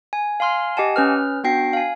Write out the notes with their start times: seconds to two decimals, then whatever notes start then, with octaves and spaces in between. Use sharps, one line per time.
0.13 G#5
0.40 F5 G#5 C6 F6
0.77 G4 D#5 F#5 G#5 A5
0.96 C#4 B4 F6
1.44 B3 D4 F#4 G5 A#6 C7
1.73 F5 G#5